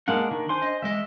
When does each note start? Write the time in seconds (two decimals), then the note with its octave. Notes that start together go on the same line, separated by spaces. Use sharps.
0.08 G#3 A#3 D4 F#5
0.31 D#3
0.49 C5 G#5 C6
0.62 D#5
0.82 E2 G#3 D#5 E5